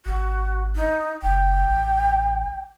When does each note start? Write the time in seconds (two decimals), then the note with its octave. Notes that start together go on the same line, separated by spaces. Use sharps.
0.06 G#1 F#4
0.75 D#4
1.22 F#1 G5
1.68 A1